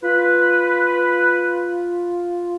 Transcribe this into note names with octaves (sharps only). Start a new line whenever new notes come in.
F4 B4